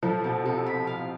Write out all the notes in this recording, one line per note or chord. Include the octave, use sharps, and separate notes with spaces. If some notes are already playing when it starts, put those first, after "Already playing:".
F3 A4
B2 A4
C3 A4
B5
F5